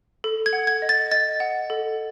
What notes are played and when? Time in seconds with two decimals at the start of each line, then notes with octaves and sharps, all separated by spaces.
0.24 A4
0.46 G#6
0.53 F#5
0.67 G#6
0.82 D#5
0.89 A6
1.11 D#5 A6
1.40 F#5
1.70 A4